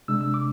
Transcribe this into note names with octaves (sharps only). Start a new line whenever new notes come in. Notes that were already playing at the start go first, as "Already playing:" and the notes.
C3 G#3 D4 E6
E6
D6